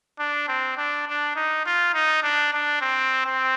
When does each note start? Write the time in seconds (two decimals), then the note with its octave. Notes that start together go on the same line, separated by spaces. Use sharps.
0.19 D4
0.48 C4
0.77 D4
1.07 D4
1.36 D#4
1.66 F4
1.94 D#4
2.23 D4
2.53 D4
2.81 C4
3.25 C4